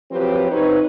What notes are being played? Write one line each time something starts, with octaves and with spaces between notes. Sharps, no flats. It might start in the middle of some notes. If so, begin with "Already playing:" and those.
F3 F#3 C4 G4 B4
C4 D#4 B4 C#5